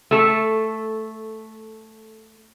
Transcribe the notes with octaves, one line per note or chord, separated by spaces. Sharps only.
A3 A4